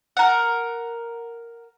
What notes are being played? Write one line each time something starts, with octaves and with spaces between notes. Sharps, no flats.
A#4 F#5